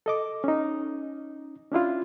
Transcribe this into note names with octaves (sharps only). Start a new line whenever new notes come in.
A4 D#5 D6
C#4 D#4
C#4 D4 E4 F4